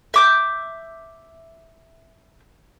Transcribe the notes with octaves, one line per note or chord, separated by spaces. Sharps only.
E5 D6 G6